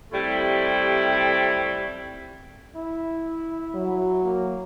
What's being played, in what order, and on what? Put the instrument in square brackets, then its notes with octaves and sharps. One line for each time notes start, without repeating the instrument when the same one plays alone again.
[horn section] C3 G3 A3 E4
[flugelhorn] E4
[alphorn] F#3
[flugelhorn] A#3